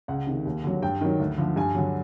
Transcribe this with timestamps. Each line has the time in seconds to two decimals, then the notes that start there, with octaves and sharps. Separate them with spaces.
0.08 C#2 F#5
0.27 C3 D#3
0.45 D#2
0.64 D3 F#3
0.82 G2 G5
1.01 D#3 F#3
1.20 D2
1.38 D3 F3
1.56 G2 G#5
1.75 D3 F#3